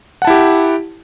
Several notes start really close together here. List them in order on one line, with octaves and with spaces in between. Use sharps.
F#5 A5 E4 G4